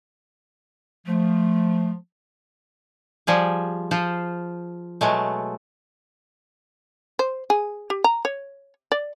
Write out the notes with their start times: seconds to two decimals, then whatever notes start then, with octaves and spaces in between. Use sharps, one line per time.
1.07 F3 A3
3.27 F3 G3 G#4
3.91 F3 F4 C5
5.01 B2 F#3 G#3 A3
7.19 C5
7.50 G#4
7.90 G4
8.04 A#5
8.25 C#5
8.92 D5